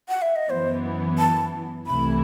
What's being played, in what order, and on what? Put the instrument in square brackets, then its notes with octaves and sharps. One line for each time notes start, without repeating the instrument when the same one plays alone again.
[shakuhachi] F#5
E5
D#5
[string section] F#2 E3 B3 [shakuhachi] C5
[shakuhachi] A5
[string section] C2 C3 E3 A3 E4 [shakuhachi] B5